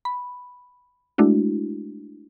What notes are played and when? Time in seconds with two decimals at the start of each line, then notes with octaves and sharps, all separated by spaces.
0.05 B5
1.18 G#3 A3 D4 E4 F#4